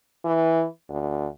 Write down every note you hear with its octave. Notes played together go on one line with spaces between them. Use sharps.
E3
D2